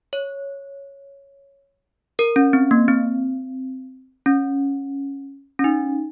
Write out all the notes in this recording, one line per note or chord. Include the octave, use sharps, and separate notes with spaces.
C#5
A#4
C#4
C4
A#3
C4
C#4
C#4
D#4